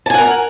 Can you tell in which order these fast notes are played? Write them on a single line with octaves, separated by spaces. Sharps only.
A5 G#5 F#5 A#4